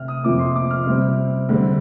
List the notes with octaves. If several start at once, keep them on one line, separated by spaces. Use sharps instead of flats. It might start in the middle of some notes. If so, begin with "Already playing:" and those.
Already playing: C3 F6
D#6
F2 C3 F3 A#3 D6
C6
D6
F6
C3 G3 C4
D3 G3 C4